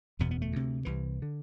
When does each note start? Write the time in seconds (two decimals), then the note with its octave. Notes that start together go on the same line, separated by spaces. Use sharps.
0.19 F#1 E2 B2 B3
0.31 B3
0.42 A3
0.52 D2 C3
0.85 C2 C3 E3
1.22 D3